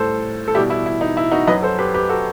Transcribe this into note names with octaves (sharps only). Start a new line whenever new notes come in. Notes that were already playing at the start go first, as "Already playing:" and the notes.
Already playing: A2 G3 A4 C5
A4
B2 G3 E4 G4
E4
E4
D#4
E4
D#4 F#4
F#2 F#3 B4 D#5
A4 C5
G4 B4
G4 B4
F#4 A4